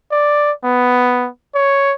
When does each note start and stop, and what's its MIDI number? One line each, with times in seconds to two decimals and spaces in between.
0.12 0.52 74
0.64 1.29 59
1.55 1.95 73